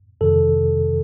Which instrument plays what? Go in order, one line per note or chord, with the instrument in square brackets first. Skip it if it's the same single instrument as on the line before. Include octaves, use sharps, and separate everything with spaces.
[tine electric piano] F2 C3 D#3 A4